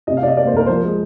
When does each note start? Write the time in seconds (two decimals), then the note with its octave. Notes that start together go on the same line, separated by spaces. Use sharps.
0.07 C3 D#5
0.17 F5
0.22 C3 D5
0.28 D#5
0.37 A#3 D5
0.47 C5
0.53 C2 A#4
0.66 F3 C5
0.84 G#3